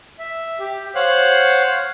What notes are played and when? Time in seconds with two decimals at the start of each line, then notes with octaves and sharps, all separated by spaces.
0.19 E5
0.59 G4
0.95 C5 C#5 F5 F#5 F#6